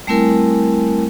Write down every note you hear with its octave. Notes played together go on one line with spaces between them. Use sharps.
G3 A3 C4 E4 A#4 G#5